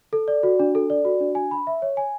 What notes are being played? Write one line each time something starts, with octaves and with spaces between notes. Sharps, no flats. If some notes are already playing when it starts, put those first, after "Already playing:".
A4
D5
F#4
D4
A4
D5
F#4
D4
G#5
B5
E5
C#5
G#5